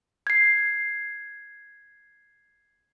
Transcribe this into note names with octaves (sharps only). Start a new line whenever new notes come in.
G#6 C7